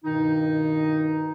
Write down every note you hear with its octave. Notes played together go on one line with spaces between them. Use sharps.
G2 B2 D#3 D#4